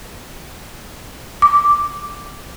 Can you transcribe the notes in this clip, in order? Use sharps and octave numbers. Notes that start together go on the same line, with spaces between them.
D6